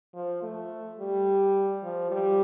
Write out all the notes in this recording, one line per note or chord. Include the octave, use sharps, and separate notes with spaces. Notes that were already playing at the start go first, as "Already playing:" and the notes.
F3
A3
G3
F3
G3